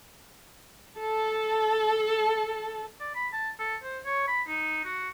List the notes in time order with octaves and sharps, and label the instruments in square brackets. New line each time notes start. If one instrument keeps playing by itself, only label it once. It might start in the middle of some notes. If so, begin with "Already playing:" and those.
[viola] A4 A5
[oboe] D5
B5
A5
A4
C5
C#5
B5
D#4
F#4